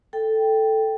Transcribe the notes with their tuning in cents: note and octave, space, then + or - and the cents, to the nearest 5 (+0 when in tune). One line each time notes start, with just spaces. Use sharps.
A4 +0 G5 +0